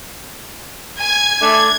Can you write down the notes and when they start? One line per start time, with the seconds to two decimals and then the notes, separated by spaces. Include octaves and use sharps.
0.97 G#5 G#6
1.42 A3 D4 G#6